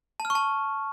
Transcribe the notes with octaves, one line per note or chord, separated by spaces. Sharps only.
A5
F6
C#6
A5